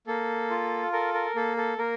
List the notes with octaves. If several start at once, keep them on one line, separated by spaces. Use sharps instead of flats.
A#3 A4
F4
A4 A#4
A#4
A#3 A4
A4
A#3 A#4